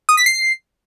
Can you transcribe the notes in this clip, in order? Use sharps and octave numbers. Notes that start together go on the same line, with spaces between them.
D#6
B6
C7